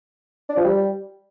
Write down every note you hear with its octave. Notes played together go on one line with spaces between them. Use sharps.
D4
F3
G3